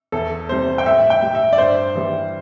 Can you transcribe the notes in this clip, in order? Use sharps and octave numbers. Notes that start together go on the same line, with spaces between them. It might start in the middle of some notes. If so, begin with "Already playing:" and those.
E2 A4
C3 G3 C5
G5
A2 E5
G5
G3
E5
D5
G2 C5
E3 G3